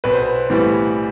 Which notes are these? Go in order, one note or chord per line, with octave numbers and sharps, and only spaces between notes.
B1 B4
C5
B4
A2 E3 G3 B3